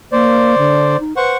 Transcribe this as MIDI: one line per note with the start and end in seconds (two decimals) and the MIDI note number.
0.12 0.58 58
0.12 0.96 72
0.12 0.96 74
0.58 0.99 50
1.00 1.16 63
1.17 1.35 71
1.17 1.37 72
1.17 1.37 78
1.17 1.37 85